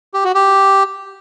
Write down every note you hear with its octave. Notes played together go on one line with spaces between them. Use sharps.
G4
F#4
G4